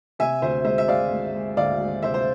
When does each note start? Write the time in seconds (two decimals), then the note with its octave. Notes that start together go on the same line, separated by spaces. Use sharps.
0.19 C3 E5 G#5
0.42 D2 C5 E5
0.65 G#3 C5 E5
0.78 E5
0.88 G#3 D5 F5
1.11 G#3
1.35 G#3
1.57 D2 D5 F5
1.81 G#3
2.02 C3 C5 E5
2.14 C5